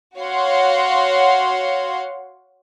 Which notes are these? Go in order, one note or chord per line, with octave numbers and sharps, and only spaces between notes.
F#4 C#5 F5 F#5 C6